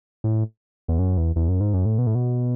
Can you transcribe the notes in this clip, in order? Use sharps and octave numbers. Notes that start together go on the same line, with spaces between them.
A2
E2
F#2
E2
E2
F#2
G#2
F#2
A2
B2
A2
B2